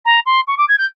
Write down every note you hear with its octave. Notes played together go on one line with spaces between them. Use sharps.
A#5
C6
C#6
D6
G#6
G6